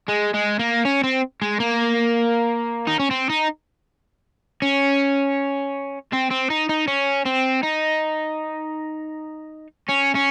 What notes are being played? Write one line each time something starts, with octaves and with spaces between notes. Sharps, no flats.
G#3
G#3
A#3
C#4
C4
G#3
A#3
D#4
C#4
C4
D#4
C#4
C4
C4
D#4
D#4
C#4
C4
D#4
C#4
C#4